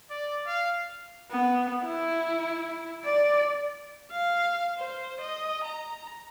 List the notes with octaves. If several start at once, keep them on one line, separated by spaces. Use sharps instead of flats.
D5
F5
B3
E4
D5
F5
C5
D#5
A#5